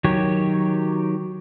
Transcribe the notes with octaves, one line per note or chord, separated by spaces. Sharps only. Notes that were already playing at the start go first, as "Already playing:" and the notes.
D#3 F#3 G4 C#5